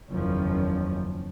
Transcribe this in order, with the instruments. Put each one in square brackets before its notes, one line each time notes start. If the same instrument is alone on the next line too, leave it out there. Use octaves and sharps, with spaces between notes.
[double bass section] F#1 E2 D#3 F3 C#4